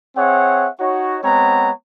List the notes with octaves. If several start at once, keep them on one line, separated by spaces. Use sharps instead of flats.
C4 G#4 C#5 E5 F#5
D#4 F#4 C#5
G#3 B3 C4 C#5 F#5 A#5